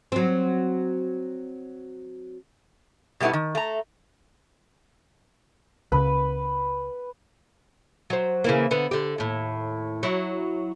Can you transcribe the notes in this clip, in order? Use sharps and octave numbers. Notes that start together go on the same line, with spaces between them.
F#3 C4
B2 G3 A3 B3 E4
D#3
A3 A#5
C#2 C#3 B4
F#3 C5
C#3 E3 A#3
D3 B3
D3 G4
D#2 A2
F#3 E4